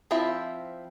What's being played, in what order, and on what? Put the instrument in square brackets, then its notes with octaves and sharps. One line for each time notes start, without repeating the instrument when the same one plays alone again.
[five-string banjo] F3 C4 E4 C5 E5